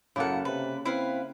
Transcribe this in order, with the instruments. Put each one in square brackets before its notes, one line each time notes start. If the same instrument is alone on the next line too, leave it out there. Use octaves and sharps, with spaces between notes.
[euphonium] F#2 [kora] C#3 A#3 A4 [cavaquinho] E4 F#5
[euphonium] C3 [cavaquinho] B4
[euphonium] C4 [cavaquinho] E4 B4 F5